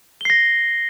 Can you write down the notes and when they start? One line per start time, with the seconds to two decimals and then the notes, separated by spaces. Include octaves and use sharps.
0.21 G7
0.25 C7
0.30 A#6